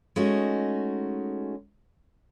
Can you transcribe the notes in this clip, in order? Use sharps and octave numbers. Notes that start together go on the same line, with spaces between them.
G#3 A3 C#4 D#4 F#4